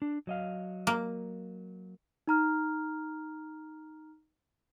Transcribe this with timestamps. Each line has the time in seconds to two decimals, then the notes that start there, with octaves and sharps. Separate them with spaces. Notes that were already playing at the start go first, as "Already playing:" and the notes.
0.02 D4
0.27 F#3 D#5 F5
0.87 A#3
2.27 D#4 A#5 F6